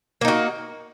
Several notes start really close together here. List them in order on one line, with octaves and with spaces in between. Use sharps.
A#3 D#4 F#4